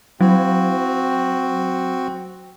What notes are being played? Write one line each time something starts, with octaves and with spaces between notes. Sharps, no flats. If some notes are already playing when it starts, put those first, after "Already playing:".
F#3 C4 F#4